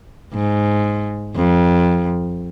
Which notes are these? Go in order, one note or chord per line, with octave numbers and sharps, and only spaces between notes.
G#2
F2